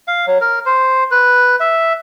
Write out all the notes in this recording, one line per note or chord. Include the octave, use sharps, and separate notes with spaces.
F5
F#3
A#4
C5
B4
E5